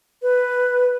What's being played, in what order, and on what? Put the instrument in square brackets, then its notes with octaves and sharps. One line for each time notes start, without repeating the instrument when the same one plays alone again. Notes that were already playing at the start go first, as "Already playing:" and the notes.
[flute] B4